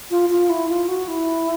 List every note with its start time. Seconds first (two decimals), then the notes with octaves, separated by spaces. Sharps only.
0.11 F4
0.29 F4
0.50 E4
0.69 F4
0.88 F#4
1.08 E4